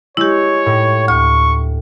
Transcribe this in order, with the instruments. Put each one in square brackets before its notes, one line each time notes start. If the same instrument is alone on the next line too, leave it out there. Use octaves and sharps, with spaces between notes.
[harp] G#3 [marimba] E4 G4 [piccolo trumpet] C#5
[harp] A2
[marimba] D2 F6 [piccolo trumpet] C#6